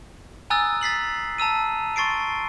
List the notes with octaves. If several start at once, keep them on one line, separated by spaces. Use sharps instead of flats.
G#5 A#5 D#6 E6 F#6 A6
A6 B6 C7 F#7
A5 A#5 E6 D#7
C6 C#6 A6 C7 D7